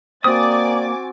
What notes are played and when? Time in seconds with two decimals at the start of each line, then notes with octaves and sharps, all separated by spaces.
0.24 A#3 C4 F#4 D5 G#5 D6 D#6 A6